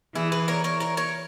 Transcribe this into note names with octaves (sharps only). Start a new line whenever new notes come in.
E3 E4 G#4
G#4 B4
A#4 C#5
A#4 C#5
A#4 C#5
A#4 C#5